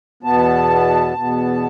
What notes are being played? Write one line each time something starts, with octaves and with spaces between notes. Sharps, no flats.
E2 B2 B3 A5
E2 B2 B3